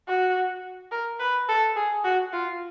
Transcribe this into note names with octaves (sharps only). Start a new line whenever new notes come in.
F#4
A#4
B4
A4
G#4
F#4
F4